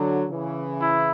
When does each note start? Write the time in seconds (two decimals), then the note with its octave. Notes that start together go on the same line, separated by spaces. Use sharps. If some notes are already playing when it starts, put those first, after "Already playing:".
Already playing: D3 F#3
0.30 C#3 E3
0.81 E4